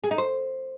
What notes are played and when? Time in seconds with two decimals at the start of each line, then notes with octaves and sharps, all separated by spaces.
0.04 G#4
0.11 D#4
0.18 C5